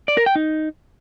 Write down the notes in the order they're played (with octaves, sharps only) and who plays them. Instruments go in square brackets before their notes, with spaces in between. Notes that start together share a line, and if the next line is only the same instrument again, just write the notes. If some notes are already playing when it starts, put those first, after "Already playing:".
[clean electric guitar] D5
A#4
G5
D#4